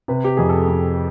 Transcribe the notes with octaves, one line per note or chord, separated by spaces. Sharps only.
C3 B4
G4
F2 G#4
A4
F2